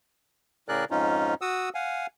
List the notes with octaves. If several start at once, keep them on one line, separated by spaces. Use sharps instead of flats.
A2 C#3 G#4 A#4 D5 F#6
F2 G#2 C#4 D#4 F4
F#4 F#5 D#6 E6
F5 F#5 G#5